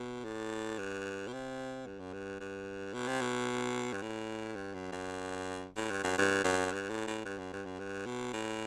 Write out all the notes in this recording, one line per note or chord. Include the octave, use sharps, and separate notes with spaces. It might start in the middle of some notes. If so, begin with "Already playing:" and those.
Already playing: B2
A2
G2
B2
C3
G2
F#2
G2
G2
B2
C3
B2
G2
A2
G2
F#2
F#2
A2
G2
F#2
G2
F#2
G2
A2
A2
G2
F#2
G2
F#2
G2
B2
A2